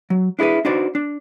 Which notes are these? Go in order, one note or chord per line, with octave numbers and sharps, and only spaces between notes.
F#3
D4 E4 G#4 A4 B4
D4 D#4 F#4 B4 C5 D5
D4